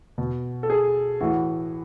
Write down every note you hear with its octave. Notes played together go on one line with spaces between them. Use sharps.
B2
A4
G#4
A2 E3 F#4